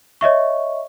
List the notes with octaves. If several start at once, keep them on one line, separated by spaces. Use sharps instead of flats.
C#5 D#5 E5 C#6